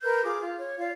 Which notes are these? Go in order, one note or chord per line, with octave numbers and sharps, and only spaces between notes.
A#4 B4 F6 G6
F4 G#4 D6
F4
C#5
F4 D5 F5